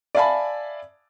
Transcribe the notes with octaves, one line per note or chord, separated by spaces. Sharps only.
D5 E5 F5 G#5 A5 B5